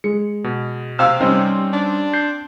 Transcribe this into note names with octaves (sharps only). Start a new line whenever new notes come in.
G#3 C#7
B2
C3 F5 E6
G3 C4 C#4 D#4
D4
G6 C7